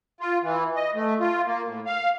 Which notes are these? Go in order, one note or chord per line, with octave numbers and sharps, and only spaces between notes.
F4
E3
D#5
A3
F4
A#3
A2
F5